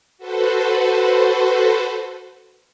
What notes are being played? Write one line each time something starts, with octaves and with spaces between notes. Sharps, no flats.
F#4 A4 B4 C5